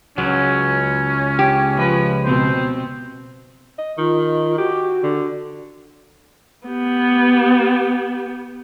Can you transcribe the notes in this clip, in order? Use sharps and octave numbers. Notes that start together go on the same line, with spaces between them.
C#2 F#3 C#4
G4
F3 B4
B2 B3 C4 C5
D#5
D#3 F4
F#4 G4
D3
B3 G4